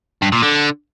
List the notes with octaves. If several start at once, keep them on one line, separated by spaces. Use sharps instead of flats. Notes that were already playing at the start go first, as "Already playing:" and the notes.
G2
A#2
D3